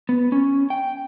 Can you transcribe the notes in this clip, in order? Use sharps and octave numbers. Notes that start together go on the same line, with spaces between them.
B3
C#4
G5